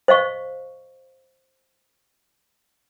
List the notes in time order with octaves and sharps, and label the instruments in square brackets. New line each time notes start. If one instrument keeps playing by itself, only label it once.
[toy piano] C5 D#5 F5 C#6